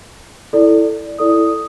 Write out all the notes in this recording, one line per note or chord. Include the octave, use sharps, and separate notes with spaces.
E4 A4 D5
E4 A4 D5 D#6